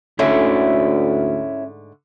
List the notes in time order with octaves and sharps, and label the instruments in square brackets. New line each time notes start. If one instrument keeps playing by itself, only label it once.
[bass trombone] D2 [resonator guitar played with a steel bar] G#2 D3 A3 [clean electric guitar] C#4 E4